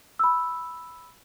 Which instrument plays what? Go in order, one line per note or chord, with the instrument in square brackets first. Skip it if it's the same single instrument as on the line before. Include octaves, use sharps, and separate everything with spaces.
[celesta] B5 E6